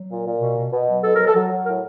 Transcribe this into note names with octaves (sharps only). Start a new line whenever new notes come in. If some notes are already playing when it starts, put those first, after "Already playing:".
Already playing: F#3
A#2
A#2
B2
B2
B2
F#3
B2 A4
A#4
F#3
A4
F#3
F#3
A2 A#4